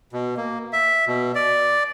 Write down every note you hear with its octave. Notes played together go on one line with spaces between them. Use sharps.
B2
A#3
E5
B2
D5